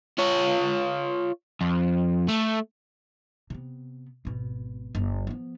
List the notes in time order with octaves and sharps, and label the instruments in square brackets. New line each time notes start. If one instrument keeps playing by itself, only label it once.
[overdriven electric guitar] F4 C#5
F2
A3
[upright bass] C3 B3
G#1 B2
F#1
F3 B3